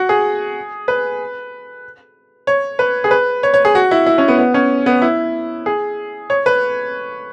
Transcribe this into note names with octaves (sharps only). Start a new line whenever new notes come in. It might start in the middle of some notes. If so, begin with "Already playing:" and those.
Already playing: F#4
G#4
B4
C#5
B4
G#4
B4
C#5
C#5
G#4
F#4
E4
E4
C#4
B3
B3
C#4
B3
E4
G#4
C#5
B4